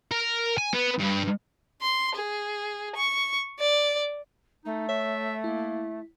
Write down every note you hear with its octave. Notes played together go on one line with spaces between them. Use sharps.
A#4
G#5
B3
G2
C6
G#4
C#6
D5
A3 D#4
C#5 E5
A#3 E4